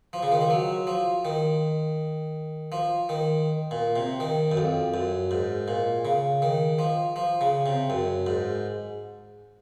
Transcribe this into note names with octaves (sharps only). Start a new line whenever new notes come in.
F3
C#3
D#3
F3
F#3
F3
D#3
F3
D#3
A#2
C3
D#3
F#2
F2
F#2
G#2
A#2
C#3
D#3
F3
F3
C#3
C3
F#2
G#2